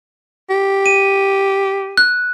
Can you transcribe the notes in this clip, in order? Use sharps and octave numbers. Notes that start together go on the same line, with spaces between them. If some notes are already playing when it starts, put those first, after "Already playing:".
G4
D#7
F#6